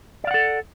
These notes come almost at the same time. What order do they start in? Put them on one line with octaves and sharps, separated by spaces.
D5 F5 F#5 A4